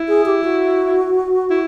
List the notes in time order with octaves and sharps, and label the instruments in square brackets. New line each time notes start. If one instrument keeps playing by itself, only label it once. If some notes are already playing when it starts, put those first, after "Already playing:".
Already playing: [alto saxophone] E4
[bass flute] G#4
G4
F#4
[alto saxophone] E4